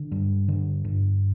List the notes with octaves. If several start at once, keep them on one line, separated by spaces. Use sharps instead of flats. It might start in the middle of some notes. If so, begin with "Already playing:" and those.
Already playing: D3
G2
D3
G2